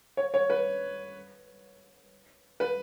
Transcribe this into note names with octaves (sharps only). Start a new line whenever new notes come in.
C#5
C#5
B4
B4